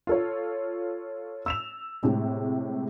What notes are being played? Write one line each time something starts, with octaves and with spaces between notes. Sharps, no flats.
F4 A4 C#5
E6 E7 F7
A2 C3 G#3